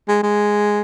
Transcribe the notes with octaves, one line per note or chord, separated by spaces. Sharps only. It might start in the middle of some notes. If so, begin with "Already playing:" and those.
G#3
G#3